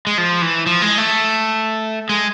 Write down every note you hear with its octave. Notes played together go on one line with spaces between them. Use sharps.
G#3
F3
E3
F3
G#3
A3
G#3